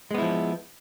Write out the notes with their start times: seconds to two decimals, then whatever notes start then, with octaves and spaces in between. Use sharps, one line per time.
0.11 G#3
0.14 B3
0.18 E4
0.22 F3